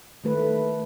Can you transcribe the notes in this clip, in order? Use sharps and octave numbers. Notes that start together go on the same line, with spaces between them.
D#3 A3 B4